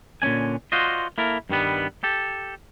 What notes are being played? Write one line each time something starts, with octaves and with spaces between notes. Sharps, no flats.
A#2 D3 C#4 D4 G#5
F4 F#4 C5 D5 D#5
A#3 E4 A4 A#4
G2 D#3 G3 B3
G4 A4